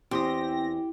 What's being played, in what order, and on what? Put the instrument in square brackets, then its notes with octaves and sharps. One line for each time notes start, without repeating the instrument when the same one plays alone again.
[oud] E2 [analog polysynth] C4 A#6 [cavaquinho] G4 C6 D#6